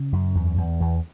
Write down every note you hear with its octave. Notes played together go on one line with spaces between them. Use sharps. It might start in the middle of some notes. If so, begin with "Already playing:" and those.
Already playing: C#3
F#2
E2
E2
E2 E3